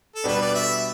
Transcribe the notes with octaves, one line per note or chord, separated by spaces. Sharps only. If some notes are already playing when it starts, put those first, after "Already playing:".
A4
B2 G3 B3 D4 B4
D5
E5